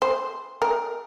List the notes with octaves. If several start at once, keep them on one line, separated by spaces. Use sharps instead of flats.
C5
A#4